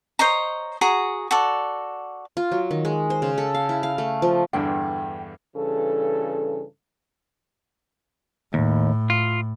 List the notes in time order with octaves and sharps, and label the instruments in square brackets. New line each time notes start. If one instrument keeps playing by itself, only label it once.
[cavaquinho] C5 C#5 D#5 A#5
F#4 G#4 A#5
F#4 A4 D5
[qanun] F4
F#3
D#3
G#3
C5
C#3
A4
F5
E4
F5
A3
F3
[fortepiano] E2 G2 D3 [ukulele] G5
[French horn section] G2 C#3 E3 A4
[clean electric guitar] D#2 [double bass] A2
[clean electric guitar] F4